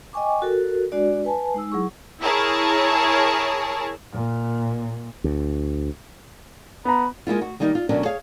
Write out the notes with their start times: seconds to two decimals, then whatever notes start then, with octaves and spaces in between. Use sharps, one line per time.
0.13 D#5 G5 G#5 C#6 D6
0.42 F#4 A4 A#4
0.92 G#3 D4 F#4 D5
1.25 B4 G#5 A5
1.54 G#3 D#4 E6
1.72 F#3 E4 G#4 C#6
2.22 E4 G#4 A#4 C#5 A5
4.12 A#2
5.24 D2
6.85 B3 A#5 B5
7.27 G#3 A#3 E4 F4
7.42 F#4
7.60 D#3 G3 A#3 D#4
7.75 F4
7.89 D2 B2 F#3 C#4 D4 A#4
8.05 G#4 C#5 F5